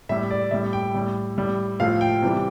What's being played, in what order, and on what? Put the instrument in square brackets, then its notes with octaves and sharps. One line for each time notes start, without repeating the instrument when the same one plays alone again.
[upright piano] A2 G3 E5
D5
A2 G3 E5
G5
A2 G3
A2 G3
A2 F3 A3 F5
G5
C3 E3 G3